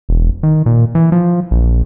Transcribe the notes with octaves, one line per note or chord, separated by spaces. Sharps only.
E1
D#3
A#2
E3
F3
A#1